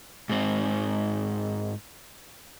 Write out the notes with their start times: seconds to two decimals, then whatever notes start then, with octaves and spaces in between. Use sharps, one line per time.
0.29 G#2 C4